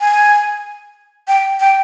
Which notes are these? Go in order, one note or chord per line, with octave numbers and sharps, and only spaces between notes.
G#5
G5
G5